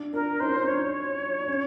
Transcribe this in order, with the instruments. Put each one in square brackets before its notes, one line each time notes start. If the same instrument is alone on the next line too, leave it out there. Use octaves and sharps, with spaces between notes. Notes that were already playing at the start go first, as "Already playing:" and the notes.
Already playing: [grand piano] D4
[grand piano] D4 [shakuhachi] A#4
[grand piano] C#4 D#4 [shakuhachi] C5
[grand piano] C#4
[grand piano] D4 [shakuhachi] C#5
[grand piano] D4
C#4